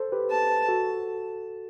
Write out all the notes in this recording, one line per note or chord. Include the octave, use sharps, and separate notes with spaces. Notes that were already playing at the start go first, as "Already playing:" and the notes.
Already playing: A4 C5
G4 B4
A5
F#4 A4